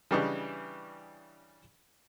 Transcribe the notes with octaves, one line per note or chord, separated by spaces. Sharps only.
C#3 E3 G3 D4 D#5 C#6